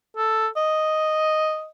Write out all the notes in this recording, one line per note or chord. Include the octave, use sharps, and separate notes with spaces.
A4
D#5